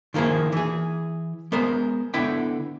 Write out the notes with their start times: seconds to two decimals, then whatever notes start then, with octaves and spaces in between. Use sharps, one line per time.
0.14 D#3 F3 A#3 E4 G#4
0.52 E3 G#4
1.52 G#3 B3 A#4 C5
2.14 D3 B3 E4 E5 G5